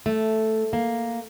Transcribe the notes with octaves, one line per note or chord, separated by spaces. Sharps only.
A3
A#3